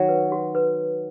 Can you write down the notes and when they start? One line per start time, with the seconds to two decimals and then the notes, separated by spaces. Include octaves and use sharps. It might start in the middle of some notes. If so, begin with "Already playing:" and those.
Already playing: D#3 F#3
0.09 B4
0.32 F#4
0.55 B4